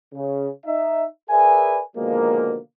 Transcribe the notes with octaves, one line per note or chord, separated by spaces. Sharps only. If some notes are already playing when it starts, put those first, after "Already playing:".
C#3
D#4 E5
G#4 A#4 B4 D5 E5 G#5
B2 D3 D#3 F3 G#3 A#3